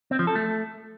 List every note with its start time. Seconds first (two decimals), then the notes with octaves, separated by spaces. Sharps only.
0.11 C4
0.19 F3
0.27 A4
0.35 A3